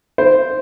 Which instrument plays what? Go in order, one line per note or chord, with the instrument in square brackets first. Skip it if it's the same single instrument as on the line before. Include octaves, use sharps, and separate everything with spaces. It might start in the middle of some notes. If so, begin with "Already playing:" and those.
[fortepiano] C5